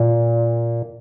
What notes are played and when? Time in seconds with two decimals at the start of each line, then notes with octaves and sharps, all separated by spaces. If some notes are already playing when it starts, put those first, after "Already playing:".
Already playing: A#2